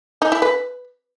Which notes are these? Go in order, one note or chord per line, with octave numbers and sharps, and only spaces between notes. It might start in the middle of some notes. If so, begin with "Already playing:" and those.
D#4
E4
B4